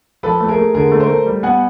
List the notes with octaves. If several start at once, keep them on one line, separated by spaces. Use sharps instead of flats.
F3 A4 B4
A3
G#4 A#4
A3
D3 G#4 A#4
A3
A#4 C5
A3
G3
B3 F#5 G#5